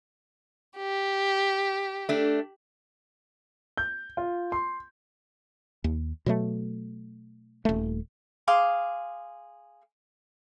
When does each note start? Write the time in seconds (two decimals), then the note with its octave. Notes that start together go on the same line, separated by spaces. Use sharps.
0.77 G4
2.09 A3 D4
3.77 G6
4.17 F4
4.52 C6
5.84 D#2
6.26 B2 F#3 A3
7.65 D#1 A3
8.47 G#4 F5 C6 D6